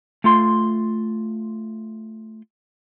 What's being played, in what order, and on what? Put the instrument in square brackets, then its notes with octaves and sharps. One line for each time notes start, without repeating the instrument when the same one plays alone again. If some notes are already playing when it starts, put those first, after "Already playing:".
[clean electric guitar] A3 F4 C6